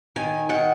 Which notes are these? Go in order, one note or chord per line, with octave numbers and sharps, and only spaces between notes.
D#3 G#5
D#3 F#5